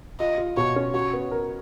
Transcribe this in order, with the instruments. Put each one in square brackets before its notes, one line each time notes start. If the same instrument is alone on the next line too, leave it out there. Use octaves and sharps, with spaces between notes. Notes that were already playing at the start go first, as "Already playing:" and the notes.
[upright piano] F4 [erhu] D#5
[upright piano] F4
[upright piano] B2 [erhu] C#5
[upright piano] C#4
[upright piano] F#4 [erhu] C#5
[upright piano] B3
A#4